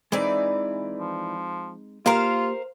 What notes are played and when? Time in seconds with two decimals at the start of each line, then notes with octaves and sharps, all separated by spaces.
0.12 E3 G#3 C4 D#4 D5
0.98 F3
2.06 A#3 F4 G4 A#4 C5 F5 A#5